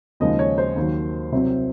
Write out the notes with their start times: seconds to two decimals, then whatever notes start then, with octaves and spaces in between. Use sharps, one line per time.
0.20 D#2 C#3 F3 G#3 D#4 D#5
0.39 C#5
0.58 C5
0.76 D#2 D#3 F#3
1.32 C2 C3 F#3 C4